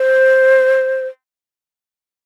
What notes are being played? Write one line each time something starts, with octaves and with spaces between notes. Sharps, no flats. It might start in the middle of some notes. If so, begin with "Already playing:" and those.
Already playing: C5